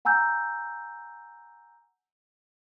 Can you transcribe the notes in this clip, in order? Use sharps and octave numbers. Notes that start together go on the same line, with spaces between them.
F#5 G#5 A#5 E6 G6